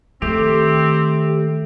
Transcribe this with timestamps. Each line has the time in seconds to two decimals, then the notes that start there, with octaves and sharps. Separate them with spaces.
0.22 D#3 A3 C4 G4